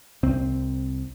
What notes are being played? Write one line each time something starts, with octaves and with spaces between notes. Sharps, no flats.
C2 C4